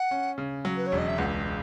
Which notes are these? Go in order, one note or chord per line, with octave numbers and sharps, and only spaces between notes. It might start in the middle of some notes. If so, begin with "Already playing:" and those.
Already playing: F#5
C#4
C#3
F#3
B4
C#5
E1
D#5
E5
C#2 F#5